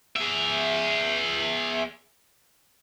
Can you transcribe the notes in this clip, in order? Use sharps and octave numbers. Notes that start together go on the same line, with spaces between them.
G#4 E5